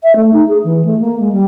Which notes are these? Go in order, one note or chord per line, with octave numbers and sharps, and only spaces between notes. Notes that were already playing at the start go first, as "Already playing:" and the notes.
E5
A3
D#4
G#4
E3
A3
A#3
G#3
G3